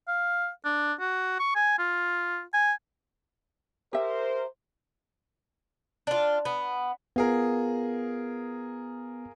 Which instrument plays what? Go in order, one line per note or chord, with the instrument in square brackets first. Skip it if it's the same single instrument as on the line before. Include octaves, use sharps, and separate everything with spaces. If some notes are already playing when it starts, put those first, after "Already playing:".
[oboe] F5
D4
F#4
C#6
G#5
F4
G#5
[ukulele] G4 E5 [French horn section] A#4 C5
[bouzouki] D4 F4
B3
[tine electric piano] B3 [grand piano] F4 G#4 A#4